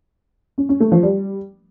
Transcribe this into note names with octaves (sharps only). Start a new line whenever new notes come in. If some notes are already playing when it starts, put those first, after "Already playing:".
C#4
C#4
A3
F3
G3